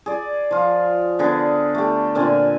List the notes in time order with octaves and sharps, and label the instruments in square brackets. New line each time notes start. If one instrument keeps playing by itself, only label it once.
[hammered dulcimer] G#4 D5
F3 F4
D3 B3 G#4
A3 G4
A#2 D3 C4 G#5